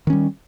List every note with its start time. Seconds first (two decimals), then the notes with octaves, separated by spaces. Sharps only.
0.07 D#3
0.10 C#4
0.13 G3